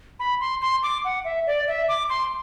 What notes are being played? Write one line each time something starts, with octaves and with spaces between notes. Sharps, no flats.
B5
C6
C6
D6
F#5
E5
D5
E5
D6
C6